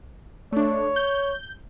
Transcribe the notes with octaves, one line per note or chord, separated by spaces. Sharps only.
A3 D4 C#5
G6